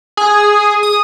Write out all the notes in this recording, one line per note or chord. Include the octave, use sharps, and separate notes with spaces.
G#4
D#6